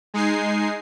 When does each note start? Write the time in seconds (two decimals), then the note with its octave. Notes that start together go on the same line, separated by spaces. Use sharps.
0.14 G#3 D#4 G#5 C7